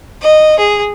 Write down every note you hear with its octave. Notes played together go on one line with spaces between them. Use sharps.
D#5
G#4